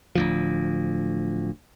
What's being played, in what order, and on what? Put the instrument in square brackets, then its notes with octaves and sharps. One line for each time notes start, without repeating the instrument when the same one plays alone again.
[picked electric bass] D1 D2 F3